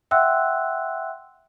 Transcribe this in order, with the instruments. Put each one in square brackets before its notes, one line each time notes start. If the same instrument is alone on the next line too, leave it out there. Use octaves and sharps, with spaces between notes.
[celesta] E5 F#5 G5 C6 E6 F#6